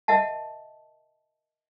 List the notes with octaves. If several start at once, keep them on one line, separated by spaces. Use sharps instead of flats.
A#4 D#5 E5 F#5 A5